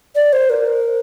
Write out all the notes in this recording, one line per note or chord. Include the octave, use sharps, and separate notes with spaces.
D5
C5
A#4